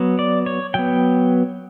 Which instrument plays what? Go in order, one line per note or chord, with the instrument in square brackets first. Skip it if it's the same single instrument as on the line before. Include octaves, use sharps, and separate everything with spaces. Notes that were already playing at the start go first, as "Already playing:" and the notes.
Already playing: [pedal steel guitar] F#3 B3
D5
C#5
F#3 B3 G5